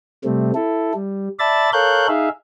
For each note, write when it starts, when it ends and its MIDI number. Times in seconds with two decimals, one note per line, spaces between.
0.24 0.52 48
0.24 0.52 55
0.24 0.52 57
0.24 0.52 60
0.55 0.93 64
0.55 0.93 69
0.94 1.29 55
1.39 1.70 74
1.39 1.70 76
1.39 1.70 81
1.39 1.70 83
1.39 1.70 93
1.73 2.07 69
1.73 2.07 70
1.73 2.07 73
1.73 2.07 77
1.73 2.07 90
1.73 2.07 91
2.08 2.29 63
2.08 2.29 68
2.08 2.29 76
2.08 2.29 77